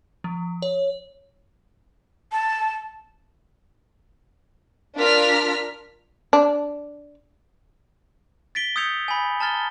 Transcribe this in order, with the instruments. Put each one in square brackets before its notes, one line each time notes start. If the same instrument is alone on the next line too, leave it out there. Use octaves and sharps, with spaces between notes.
[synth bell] F3
C#5
[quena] A5
[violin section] D4 F4 A#4 F6 B6
[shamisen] D4
[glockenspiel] A6 B6 D7 G7
D#6 E6 G6 G#6 C#7 F7
G#5 B5
A5 A#5 F6 A6 G7